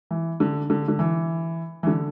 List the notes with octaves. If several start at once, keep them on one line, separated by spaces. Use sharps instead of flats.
E3
D3
D3
D3
E3
E3
D3